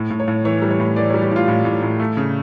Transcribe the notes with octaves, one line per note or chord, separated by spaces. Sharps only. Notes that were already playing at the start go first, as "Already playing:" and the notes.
Already playing: A2
A2
C#5
A2
E3 C#5
G3
C#5
A2
E3 D5
C#5
G3
G4
A2 F4
A2
A2
A2
A3
C#3